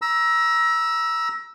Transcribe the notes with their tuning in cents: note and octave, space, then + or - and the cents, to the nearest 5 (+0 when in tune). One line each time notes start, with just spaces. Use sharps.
A#5 +30 E6 +0